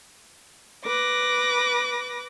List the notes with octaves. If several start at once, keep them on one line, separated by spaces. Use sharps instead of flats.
B4 D6 A#6